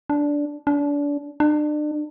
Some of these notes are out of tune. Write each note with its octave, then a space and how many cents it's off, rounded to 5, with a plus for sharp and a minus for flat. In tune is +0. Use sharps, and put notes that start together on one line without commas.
D4 -10
D4 -30
D4 +35